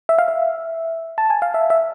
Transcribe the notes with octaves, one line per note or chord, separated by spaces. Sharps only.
E5
F5
E5
A5
G#5
F5
E5
E5